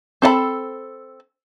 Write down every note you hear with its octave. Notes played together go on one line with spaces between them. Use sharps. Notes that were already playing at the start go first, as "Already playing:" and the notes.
C4 A4 F5 B5